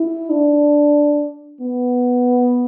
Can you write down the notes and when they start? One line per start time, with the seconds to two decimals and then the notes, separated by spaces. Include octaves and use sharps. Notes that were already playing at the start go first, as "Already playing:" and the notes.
Already playing: E4
0.30 D4
1.61 B3